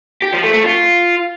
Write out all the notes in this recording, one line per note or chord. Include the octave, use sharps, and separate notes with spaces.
G4
F3
A3
A3
F4